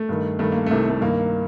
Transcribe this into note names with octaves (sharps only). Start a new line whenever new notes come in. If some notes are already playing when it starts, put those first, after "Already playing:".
Already playing: A3
G2 D#3
G2 D#3 A3
A#3
C2 C3 D#3 A3
A3
G2 D#3 A#3